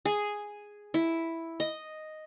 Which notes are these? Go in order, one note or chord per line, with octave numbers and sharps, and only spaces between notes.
G#4
E4
D#5